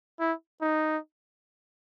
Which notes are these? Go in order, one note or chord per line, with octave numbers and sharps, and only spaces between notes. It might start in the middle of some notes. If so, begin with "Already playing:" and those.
E4
D#4